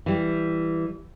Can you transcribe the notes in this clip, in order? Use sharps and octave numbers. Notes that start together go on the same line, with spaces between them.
E3 G3